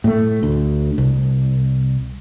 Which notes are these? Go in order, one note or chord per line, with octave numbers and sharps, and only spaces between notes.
A2 A3
D2
C2